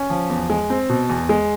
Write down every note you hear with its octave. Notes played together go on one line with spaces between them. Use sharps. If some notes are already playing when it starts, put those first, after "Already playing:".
Already playing: C#4
F3
E2
G#3
C4
B2
E2
G#3